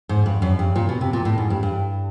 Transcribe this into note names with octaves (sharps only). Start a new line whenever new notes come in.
G#2
G2
F#2
G2
A#2
B2
C3
A#2
A2
G#2
G2
G2